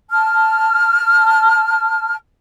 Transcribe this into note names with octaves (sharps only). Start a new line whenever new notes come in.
A5 F6